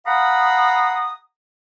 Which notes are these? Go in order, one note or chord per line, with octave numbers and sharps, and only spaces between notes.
F5 F#5 A#5 B5 D#6